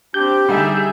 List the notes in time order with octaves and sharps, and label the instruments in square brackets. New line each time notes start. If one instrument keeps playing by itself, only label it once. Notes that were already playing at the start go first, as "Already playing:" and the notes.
[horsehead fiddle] C4 D4 [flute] G4 [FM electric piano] G6
[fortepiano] D3 G3 D#4 [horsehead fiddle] G#4 E5